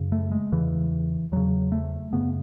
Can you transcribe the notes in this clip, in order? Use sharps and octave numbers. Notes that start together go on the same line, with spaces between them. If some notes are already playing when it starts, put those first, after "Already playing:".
Already playing: F#2 C#3
A3
G#3
E2 C#3 E3
E2 C#3 F#3
A3
F#2 C#3 B3